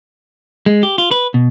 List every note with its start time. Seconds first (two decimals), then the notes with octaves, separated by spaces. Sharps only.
0.66 G#3
0.83 G4
0.98 F4
1.11 B4
1.34 B2